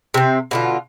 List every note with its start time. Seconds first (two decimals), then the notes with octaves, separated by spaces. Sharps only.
0.14 C3 C4
0.51 B2 D3 F4